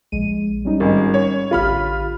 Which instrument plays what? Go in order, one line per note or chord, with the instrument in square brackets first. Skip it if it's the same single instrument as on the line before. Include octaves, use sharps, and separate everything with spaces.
[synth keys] A#1 G#3 D#7
G3 C#4 D#4
[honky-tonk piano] G#1 G#3
C#5
[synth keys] A1 D3 G4 [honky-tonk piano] F4 B5 F6